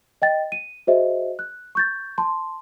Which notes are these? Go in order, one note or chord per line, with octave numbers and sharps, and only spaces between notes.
D#5 G5 A6
D#7
F#4 G#4 C5 D#5 E5
F#6
C#6 G6 A6
A5 C6